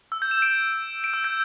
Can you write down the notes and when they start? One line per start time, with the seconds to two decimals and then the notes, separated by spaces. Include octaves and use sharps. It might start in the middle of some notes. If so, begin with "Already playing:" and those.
0.12 E6
0.22 G6
0.31 E7
0.42 D7
1.04 D7
1.14 E6
1.24 G6